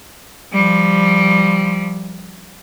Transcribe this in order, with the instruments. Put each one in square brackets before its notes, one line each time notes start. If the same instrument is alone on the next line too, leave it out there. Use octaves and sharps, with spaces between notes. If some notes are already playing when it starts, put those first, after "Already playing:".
[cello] F3 G3